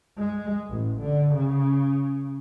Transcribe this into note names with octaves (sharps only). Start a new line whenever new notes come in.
G#3
A1
D3
C#3